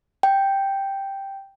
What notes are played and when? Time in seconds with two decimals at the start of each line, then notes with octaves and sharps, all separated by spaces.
0.23 G5